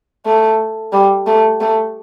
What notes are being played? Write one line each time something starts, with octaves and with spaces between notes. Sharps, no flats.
A3
G3
A3
A3